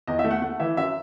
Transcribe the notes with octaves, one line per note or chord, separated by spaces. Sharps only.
E2 D#5
E5
A3
F#5
A3 F#5
E3 E5
F#2 E5